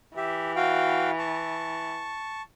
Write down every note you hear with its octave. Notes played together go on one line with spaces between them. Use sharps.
E3 G4 E5
F#4 F5 G5
A5 C#6